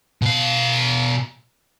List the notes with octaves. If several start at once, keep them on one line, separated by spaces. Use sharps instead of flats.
B2 F5